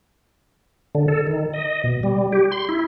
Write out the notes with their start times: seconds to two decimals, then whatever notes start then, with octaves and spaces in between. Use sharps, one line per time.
0.95 D3
1.08 A4
1.27 D#3
1.53 D#5
1.84 B2
2.03 G3
2.32 G4
2.52 C6
2.69 E4